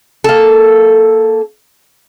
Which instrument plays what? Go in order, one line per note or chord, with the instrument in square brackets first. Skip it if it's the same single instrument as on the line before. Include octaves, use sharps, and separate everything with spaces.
[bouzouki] A#3 A4